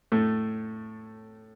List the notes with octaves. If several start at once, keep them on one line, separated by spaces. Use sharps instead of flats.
A2 A3